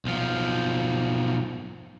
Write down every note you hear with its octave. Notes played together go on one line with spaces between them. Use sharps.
B1 F3